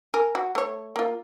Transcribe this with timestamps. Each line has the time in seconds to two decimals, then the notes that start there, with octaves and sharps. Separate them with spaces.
0.14 A#4 G#5
0.35 F#4
0.55 A3 C#5
0.96 A#3 F4